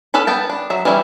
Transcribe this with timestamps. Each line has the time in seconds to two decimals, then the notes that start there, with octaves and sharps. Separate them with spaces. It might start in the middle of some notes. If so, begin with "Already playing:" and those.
0.14 B3 C#4 A4 B4 B5
0.27 B3 G5 A5
0.50 D4
0.70 F#3 E5
0.85 E3 G3 C#4 D#4 E4